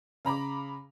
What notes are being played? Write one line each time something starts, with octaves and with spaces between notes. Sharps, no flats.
C#3 A#5 B5 D6